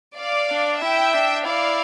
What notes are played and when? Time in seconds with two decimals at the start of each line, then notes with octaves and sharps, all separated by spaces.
0.17 D5 F5
0.50 D4
0.81 E4 E5 G5
1.14 D4
1.45 E4 D5 F5